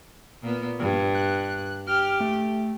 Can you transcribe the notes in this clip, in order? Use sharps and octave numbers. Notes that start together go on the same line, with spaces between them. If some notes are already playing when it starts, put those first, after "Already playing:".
A#2 B3
G2
F#6
G4 F6
A3